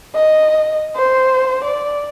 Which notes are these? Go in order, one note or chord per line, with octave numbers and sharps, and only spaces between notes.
D#5
C5
D5